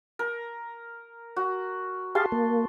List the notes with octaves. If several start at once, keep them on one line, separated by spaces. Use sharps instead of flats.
A#4
F#4
G4 G#4 F5 A5 C6
A#3